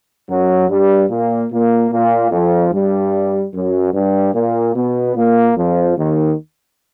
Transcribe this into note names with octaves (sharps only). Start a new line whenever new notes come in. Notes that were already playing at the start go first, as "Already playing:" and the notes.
F#2 F#3
G2 G3
A#2 A#3
A#2 A#3
A#2 A#3
F2 F3
G2 G3
F#2 F#3
G2 G3
A#2 A#3
B2 B3
A#2 A#3
F2 F3
D#2 D#3